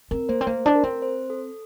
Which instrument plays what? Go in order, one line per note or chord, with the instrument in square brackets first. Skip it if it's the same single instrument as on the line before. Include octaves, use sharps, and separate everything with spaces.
[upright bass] C4 [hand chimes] A#4
[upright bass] A#3 [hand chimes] C5
[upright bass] C4
[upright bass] A#3 [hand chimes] C5
[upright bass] D4
[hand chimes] A#4
[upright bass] C4
[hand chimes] C5
A4